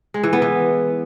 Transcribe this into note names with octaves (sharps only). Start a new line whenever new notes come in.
G#3
E3
B3
E3